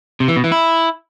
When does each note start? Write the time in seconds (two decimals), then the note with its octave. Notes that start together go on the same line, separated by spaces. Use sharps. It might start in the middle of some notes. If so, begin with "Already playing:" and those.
0.20 C3
0.28 E3
0.36 B2
0.44 E3
0.52 E4